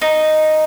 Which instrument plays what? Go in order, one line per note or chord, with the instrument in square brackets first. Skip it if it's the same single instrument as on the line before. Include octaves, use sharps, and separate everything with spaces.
[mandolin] D#4